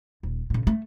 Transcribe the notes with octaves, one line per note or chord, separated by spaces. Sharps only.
D#1
A#2 C#3
A3